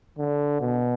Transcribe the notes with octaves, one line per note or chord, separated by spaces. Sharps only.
D3
B2